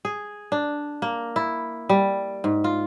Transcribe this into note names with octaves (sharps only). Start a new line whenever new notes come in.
G#4
D4
A#3
E4
G3
G#2
F4